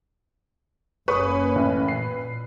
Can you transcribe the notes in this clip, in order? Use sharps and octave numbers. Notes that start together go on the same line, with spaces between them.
F#1 A#3 C#4 B4 C#6 D#6
A1
A#2 C7